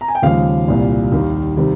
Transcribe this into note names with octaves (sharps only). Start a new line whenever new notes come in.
A#5
G#5
G5
D#2 C#3 F3 G#3 F5
C2 A#2 G3
D#2 D#3 G3
C3 D#3 G3